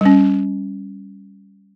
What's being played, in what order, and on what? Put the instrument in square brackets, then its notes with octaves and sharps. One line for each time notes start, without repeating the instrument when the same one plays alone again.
[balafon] G3 C#4